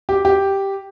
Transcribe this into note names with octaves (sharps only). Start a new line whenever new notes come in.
G4
G4